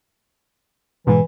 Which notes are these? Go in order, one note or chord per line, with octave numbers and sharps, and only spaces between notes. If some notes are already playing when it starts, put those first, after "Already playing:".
G#2 B2 E3